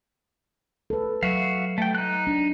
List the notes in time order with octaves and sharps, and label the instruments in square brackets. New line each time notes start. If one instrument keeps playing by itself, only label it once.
[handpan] A4 B4
[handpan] F#3 [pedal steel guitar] F#4 E5 F5
[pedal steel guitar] A3 G5
D#4 F#6
[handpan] D4